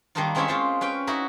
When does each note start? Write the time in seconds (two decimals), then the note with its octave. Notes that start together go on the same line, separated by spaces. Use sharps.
0.15 D#3 G3 A#3 D4 D#4 F4
0.35 G#3 C4 C#4 E4 C#5 E5
0.48 G#3 F4 C5
0.81 C#4 B4 F5 G5
1.07 D#4 E4 F#4